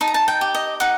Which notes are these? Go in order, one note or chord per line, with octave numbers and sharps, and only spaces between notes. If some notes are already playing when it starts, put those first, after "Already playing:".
D#4 A5
A#5
A5
G5
G4
D#5
D#4 F#5